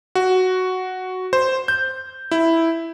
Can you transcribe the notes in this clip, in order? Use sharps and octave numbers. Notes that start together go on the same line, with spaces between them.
F#4
C5
G6
E4